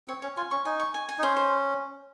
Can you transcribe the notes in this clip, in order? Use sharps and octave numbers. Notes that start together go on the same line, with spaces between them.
C4 C#5
C#4 C#5
F4 G#5
C#4 C#6
D#4 G#5
C#6
G#5
G#5
D#4
C#4 C5
C5